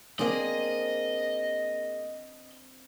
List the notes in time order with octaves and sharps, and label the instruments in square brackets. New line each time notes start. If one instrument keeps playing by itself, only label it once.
[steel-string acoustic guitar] A#3 G#4 [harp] C4 D4 C5 [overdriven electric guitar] D#5